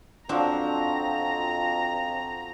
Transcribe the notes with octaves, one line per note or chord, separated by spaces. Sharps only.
F2 F3 F#3 C4 D4 A#5